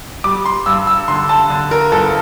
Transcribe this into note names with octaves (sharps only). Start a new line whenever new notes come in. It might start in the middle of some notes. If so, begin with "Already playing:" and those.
G3 D6
C6
G2 E6
E6
D3 C6
A5
D3
A#4
G1 A4